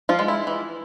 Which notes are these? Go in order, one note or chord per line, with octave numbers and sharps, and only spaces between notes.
F3 F4
G#3
E4
E3